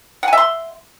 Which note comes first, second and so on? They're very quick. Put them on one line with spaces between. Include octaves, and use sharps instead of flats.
F#5 G#5 E5 C6